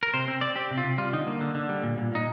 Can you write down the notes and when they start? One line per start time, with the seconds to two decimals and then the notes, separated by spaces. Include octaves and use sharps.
0.03 A#4
0.14 C3 C5
0.28 C4
0.41 C4 D5
0.56 C4 G4
0.71 C3
0.77 F4
0.84 C3
0.98 G3 F4
1.13 D3 D#4
1.27 A#3
1.41 D3
1.55 D3
1.69 G3
1.83 A#2
1.98 A#2
2.12 A#2 D#4